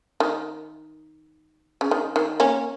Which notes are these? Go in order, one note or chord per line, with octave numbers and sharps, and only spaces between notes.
D#3
C#3
D#3
D#3
A#3 C#4